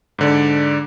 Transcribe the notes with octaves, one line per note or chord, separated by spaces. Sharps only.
G#2 D3 D5